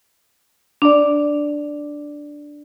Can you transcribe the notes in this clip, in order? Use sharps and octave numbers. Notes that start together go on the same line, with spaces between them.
D4 D5